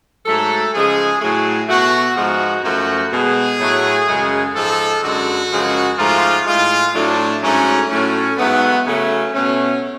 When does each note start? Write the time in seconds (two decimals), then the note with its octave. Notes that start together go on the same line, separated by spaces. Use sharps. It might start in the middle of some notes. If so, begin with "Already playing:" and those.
0.25 G#2 F#3 A3 A4
0.73 C#3 F3 G#3 G#4
1.20 A2 F#3 A3 G#4
1.68 B2 A3 F#4
2.16 G#2 F3 G#3 F#4
2.64 F#2 F3 A3 F#4
3.12 B2 G#3 G#4
3.60 A2 F#3 A3
4.07 F#2 C#3 G#3
4.55 G#2 F3 G#3 A4
5.03 F#2 D3 G#3 F#4
5.52 F#2 C#3 F3 G#3
5.98 G#2 F3 A3 F4
6.46 A2 G#3 F4
6.94 A2 F#3 A3 D4
7.42 G#2 F#3 A3 C#4
7.89 A2 F#3 A3 C#4
8.37 G#2 F#3 A3 B3
8.86 C#3 F#3 A3 C#4
9.33 B2 A3 C#4